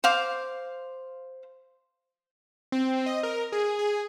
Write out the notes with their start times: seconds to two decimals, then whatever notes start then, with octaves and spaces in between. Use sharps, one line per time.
0.04 C5 F5 D6
2.72 C4
3.06 D#5
3.23 A#4
3.52 G#4
3.79 G#4